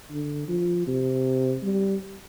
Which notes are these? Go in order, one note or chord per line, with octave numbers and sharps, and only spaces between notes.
D3
F3
C3
G3